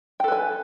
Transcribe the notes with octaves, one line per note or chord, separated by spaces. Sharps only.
A4 B4 G5 G#5